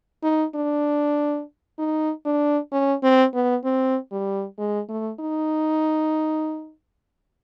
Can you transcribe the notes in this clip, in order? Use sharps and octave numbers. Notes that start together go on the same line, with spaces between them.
D#4
D4
D#4
D4
C#4
C4
B3
C4
G3
G#3
A3
D#4